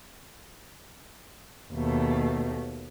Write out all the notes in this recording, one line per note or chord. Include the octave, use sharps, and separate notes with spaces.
D#2 B2 A3